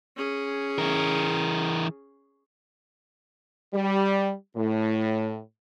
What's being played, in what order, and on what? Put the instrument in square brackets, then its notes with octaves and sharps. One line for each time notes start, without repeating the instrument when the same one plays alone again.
[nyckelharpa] C#4 G#4
[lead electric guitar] E3 A#4
[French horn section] G3
A2